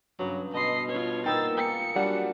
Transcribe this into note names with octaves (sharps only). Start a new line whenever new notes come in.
G2 C#3 F#3
B2 D#5 A5 B5 C6 C7
F4 C#5
A#2 B3 D#4 G5 A#5 E6 A6
A#3 G#4 G5 C#7
F#3 G3 D4 F#5